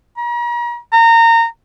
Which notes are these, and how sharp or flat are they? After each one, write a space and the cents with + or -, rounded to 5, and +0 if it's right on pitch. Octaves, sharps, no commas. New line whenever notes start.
A#5 +40
A#5 -25